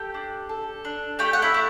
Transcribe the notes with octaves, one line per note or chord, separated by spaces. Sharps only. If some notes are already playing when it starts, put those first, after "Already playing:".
Already playing: G4 A4 G5
D4
A4
D4
A3 G4 G5
F#5
E4 E5
A3